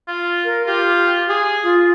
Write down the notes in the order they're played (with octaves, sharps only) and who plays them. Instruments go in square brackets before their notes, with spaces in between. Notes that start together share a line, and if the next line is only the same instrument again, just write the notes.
[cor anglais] F4
[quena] A#4
[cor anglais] F4 [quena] G4
[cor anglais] G#4
[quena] F4